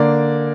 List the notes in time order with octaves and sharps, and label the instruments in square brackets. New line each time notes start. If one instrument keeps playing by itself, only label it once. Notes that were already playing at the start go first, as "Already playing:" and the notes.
Already playing: [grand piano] D3 A#3 D5